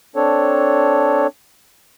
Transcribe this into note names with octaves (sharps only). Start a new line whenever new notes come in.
C4 D4 A4 C#5